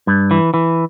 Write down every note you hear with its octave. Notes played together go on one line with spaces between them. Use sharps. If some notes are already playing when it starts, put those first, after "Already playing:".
G2
E3
E3